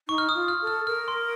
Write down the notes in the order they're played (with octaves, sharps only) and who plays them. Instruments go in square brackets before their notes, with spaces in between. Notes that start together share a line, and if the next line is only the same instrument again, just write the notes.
[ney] D#4 [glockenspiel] C#6
[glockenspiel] F6
D#6
[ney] F4
[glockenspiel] F6
[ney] A4
[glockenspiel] F6
[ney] A#4 [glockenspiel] F6
[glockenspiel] C6